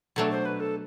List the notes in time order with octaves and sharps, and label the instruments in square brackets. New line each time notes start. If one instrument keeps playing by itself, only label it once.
[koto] B2 F#3 A3 D4 [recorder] A4
[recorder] C5
B4
A4